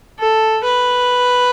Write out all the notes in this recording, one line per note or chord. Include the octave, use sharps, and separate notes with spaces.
A4
B4